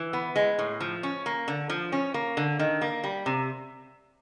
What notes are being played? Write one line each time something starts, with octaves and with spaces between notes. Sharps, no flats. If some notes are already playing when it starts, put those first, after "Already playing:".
Already playing: E3
B3
G#3
A2
F3
C#4
A#3
D3
F3
C#4
A#3
D3
D#3
A#3
G3
C3